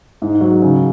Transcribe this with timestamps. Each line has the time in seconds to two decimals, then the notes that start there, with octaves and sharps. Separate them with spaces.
0.22 G#2
0.41 F#3
0.62 C#3